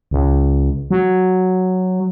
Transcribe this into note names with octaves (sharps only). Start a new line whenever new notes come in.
C#2
F#3